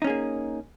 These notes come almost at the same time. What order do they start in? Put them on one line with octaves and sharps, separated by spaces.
D#4 C#4 G#4 A#3